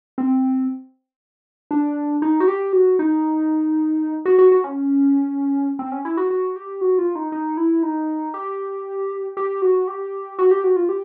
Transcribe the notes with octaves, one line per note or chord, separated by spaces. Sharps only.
C4
D4
D#4
F#4
G4
F#4
D#4
F#4
F#4
F#4
C#4
C4
C#4
E4
F#4
F#4
G4
F#4
F4
D#4
D#4
E4
D#4
G4
G4
F#4
G4
F#4
G4
F#4
F4
G4